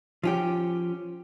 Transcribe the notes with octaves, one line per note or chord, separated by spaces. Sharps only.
F3 C#4 G4